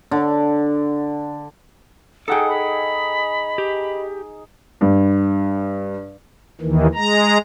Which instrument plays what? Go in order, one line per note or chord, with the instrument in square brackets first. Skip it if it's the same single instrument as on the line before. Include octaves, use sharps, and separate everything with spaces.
[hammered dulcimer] D3
[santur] D#4 G#4 [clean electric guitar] A4 F#5 G5 [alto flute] D#5
[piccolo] B5
[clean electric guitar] G4
[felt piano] G2
[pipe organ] D#2 D#3 E3
G#3 A#5